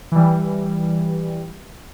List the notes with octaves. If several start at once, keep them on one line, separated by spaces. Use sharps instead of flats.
E3 G3